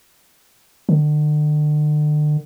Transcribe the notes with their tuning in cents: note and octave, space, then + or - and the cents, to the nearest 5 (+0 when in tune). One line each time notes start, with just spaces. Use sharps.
D3 +40